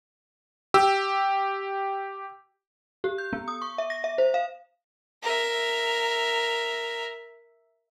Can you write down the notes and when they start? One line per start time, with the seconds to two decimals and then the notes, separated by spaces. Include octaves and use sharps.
0.74 G4 E6
3.04 G4
3.18 G6
3.33 B3
3.48 D#6
3.62 C#6
3.78 E5
3.90 A#6
4.04 E5
4.18 C5
4.34 F5
5.23 A#4 E5